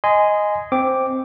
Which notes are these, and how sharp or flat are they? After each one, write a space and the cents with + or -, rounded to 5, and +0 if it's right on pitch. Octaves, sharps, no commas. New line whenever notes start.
D#5 +0 G#5 +0 C6 -25
C4 +0 D6 +0